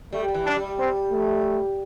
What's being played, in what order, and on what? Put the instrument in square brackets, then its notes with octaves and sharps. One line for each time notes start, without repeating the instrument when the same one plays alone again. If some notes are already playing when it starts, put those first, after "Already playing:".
[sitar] G3 [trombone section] A3
[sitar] G3
E3
[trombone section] D4
[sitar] G3
[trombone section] C4
A3